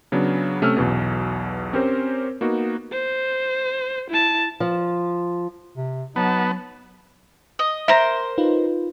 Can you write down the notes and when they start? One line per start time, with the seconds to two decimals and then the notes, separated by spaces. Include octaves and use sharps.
0.12 C#3 F#3 B3 D4
0.62 C3 A3 C#4 E6 F6
0.77 B1 E2 B2
1.73 C4 C#4 G4 A#4 C5
2.41 A#3 B3 D#4 F#4
2.93 C5
4.10 E4 A5
4.60 F3
5.77 C3
6.16 F#3 B3 D#4 F#4 A5
7.59 D#5
7.88 A#4 C5 E5 A#5 A#6
8.38 D#4 F4 B4